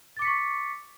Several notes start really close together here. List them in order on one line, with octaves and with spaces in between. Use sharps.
A6 D6 C#7 B6 C#6